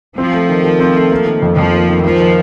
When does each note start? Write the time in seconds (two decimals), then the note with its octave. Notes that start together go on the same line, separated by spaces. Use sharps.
0.18 F3 C4
0.34 A3
0.49 D#3
0.64 D#3
0.80 C4
0.96 A3
1.11 A#3
1.27 D#3
1.42 F2
1.57 F2 F3
1.73 A#3
1.89 D#3
2.04 F3 A#3
2.20 D#3